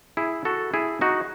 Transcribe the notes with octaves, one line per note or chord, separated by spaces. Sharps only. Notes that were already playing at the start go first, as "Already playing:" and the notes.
E4 G#4
F#4 A4
E4 G#4
D#4 F#4